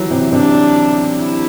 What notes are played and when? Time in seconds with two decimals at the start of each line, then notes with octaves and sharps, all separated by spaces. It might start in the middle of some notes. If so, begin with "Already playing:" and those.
Already playing: E3 F#3
0.11 C3
0.32 C3 D4
1.19 E4